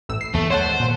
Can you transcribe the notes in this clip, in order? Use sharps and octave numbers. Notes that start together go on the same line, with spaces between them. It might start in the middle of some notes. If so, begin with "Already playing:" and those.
A1 A2 E6
C7
D#2 E3 A3 B3
D#3 G#3 C5 C#5 F#5 A5
A#2